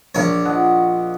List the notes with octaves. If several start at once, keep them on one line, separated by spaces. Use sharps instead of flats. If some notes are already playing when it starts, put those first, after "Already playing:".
A#1 D4 C#5
F3 D#5 F#5